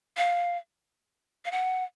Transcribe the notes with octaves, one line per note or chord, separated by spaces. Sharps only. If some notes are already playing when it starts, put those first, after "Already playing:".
F5
F5
F#5